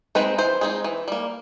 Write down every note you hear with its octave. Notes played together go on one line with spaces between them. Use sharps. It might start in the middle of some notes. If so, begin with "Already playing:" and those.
G#3 C4 D#4 B4
E3 C5
G#3 C4 D#4
E3
G3 A#3